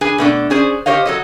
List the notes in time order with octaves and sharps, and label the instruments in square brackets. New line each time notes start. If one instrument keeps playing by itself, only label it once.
[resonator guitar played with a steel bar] D4 G#4 B4 G#5
B2 A3 D4
C#4 G#4 C5 D5
G4 C5 C#5 D#5 F5
F#3 A4 D#5